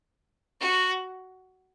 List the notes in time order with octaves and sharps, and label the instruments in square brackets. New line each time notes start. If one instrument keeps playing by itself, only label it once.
[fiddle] F#4